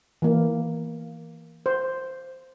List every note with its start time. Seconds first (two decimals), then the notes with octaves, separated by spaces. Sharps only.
0.22 E3 A#3
1.66 C5